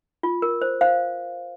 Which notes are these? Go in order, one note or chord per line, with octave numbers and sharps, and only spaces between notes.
F4
A#4
C5
C5 F5